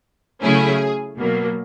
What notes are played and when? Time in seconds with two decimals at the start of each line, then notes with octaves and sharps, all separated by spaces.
0.41 C#3 F#3 A3 C#4 E4 G#4
1.17 B2 F#3 A#3